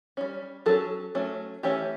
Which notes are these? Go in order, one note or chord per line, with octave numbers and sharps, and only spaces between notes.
G3 C#4
F#3 C#4 A4
F#3 A3 C#4
E3 A3 C#4 G4